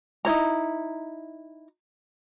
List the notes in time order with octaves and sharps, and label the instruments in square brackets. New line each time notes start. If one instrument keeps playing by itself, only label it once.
[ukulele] D#4 E4 C#5 A#5